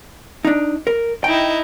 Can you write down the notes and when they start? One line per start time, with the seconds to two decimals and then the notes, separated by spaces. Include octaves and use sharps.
0.45 D4 D#4
0.87 A#4
1.24 D#4 E4 D#5 G5